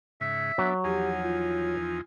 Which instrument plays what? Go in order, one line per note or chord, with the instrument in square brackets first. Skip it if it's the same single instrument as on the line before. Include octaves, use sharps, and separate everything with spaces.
[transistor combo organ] G#2 C#3 [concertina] E5
[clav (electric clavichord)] F#3 [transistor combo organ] B3 D4
[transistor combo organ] E2 F3 D#4 [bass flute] G4 [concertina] G#5
[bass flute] F4